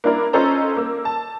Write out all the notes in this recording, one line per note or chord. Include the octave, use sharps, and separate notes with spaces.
A#3 D4 E4 A#4
C#4 D#4 F4 A4 C5 A#5
A#3 E6
A5